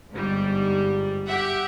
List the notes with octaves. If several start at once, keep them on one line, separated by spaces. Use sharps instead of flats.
G1 G#2 G3
G4 E5 F#5